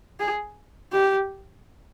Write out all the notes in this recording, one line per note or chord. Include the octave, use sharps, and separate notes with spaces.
G#4
G4